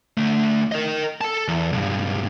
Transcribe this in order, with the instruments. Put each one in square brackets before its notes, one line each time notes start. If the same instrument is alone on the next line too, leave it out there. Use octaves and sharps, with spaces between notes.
[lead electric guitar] D3 A3
A#4 D#5
A4 A5
E2
B1 G2